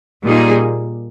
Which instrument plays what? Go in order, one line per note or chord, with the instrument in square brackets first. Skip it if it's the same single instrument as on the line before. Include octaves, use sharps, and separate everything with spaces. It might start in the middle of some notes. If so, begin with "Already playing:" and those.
[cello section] A#2 G3 A#3 D#4 G#4